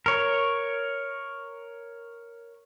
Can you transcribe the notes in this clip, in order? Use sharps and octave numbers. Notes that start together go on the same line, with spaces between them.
A#4 C#5